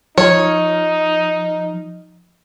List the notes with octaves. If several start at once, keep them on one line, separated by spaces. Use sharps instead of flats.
F3 D#4 C#5